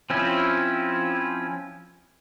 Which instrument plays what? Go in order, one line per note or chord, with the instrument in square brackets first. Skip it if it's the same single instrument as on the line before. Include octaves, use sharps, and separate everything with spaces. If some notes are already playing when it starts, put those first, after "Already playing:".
[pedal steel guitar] F3 C4 C#4 E4